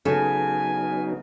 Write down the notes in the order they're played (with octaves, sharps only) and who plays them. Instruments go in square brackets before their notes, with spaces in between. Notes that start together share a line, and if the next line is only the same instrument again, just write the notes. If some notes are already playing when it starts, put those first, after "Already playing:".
[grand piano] C#3 [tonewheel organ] F#3 B3 D#4 [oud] A4 [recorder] G#5